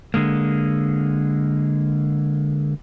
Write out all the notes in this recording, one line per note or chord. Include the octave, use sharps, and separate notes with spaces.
D3 G#3 A#3